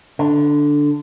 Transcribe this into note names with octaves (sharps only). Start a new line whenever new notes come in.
D3